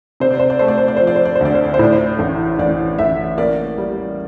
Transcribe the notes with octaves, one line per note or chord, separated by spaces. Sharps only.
C3 C5
D5
C5
D5
A3 C5
D5
C5
D5
F3 C5
D5
C5
D5
C5
D2 D5
C5
D5
C5
A2 D5
C5
A1
A1 D5
A1 E5
A#3 D5
G3